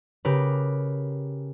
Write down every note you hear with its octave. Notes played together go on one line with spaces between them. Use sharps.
C#3 G4 A#4 B4